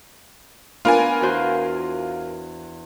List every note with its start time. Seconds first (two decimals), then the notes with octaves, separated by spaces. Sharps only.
0.85 B3 D4 F4 A#4 G#5
1.21 E2 F#4 C5